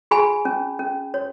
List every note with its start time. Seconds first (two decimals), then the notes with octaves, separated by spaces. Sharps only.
0.11 G#4 G#5 B5
0.45 C#4
0.79 C#4
1.14 C#5